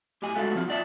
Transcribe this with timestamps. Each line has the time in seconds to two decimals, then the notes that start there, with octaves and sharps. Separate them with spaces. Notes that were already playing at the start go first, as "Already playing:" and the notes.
0.22 A2 G4 D#5 G#5
0.35 G#3 A3 B3 F4 F#4 A4
0.55 F3 F#3 G#3 B3 C4 F4
0.68 B3 F4 D5 E5 A5